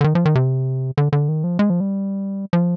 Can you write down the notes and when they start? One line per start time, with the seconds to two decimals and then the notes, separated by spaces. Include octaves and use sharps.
0.01 D3
0.04 D#3
0.15 F3
0.25 D#3
0.35 C3
0.98 D3
1.13 D3
1.29 D#3
1.44 F3
1.59 G#3
1.70 F3
1.80 G3
2.53 F3